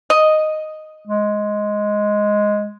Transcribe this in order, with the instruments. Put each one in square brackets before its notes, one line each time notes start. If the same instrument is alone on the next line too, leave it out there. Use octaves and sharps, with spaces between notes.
[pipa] D#5
[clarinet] G#3